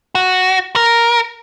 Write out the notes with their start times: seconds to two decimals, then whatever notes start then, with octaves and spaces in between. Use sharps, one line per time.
0.15 F#4
0.76 A#4